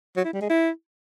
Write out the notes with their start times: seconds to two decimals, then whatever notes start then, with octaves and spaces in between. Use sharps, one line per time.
0.17 F#3
0.25 E4
0.33 G3
0.42 G#3
0.50 E4